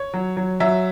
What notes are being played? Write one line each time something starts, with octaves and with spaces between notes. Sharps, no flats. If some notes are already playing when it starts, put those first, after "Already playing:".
Already playing: C#5
F#3
F#3
F#3 E5